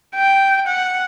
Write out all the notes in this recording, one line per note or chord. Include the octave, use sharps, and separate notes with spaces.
G5
F#5